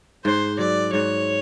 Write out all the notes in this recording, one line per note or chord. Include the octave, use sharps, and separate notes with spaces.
G#2 C5
F#3 D5
G#2 C#5